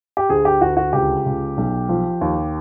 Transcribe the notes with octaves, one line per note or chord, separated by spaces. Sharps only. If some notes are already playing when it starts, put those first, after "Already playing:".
G4
D2 G#4
G4
D2 F#4
F#4
C#2 G4
C#2
B1
F3
D#2